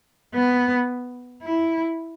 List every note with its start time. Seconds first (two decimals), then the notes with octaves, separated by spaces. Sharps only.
0.34 B3
1.43 E4